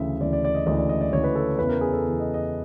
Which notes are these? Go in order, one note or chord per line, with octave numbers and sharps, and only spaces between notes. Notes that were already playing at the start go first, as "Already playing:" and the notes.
Already playing: D2 C#3 E3 E5
D2 C#3 E3 D5
D5
D5
D#5
D2 C#3 E3 D#5
D5
D#5
D5
D2 C#3 E3 C#5
B4
A4
E2 C#3 E3 B4
A#4
G#4
A4
E2 C#3 E3
D#5
D#5